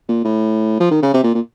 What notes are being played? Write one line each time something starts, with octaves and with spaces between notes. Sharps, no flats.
A#2
A2
F3
D#3
C#3
C3
A#2
A#2